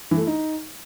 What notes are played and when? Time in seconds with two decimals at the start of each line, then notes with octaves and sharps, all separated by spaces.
0.11 E3
0.17 A3
0.22 E4
0.27 D#4